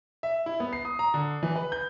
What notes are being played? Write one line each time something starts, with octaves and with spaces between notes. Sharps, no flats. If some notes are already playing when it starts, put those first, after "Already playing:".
E5
E4
B3
C7
D#6
A#5
D3
E3
B4
G6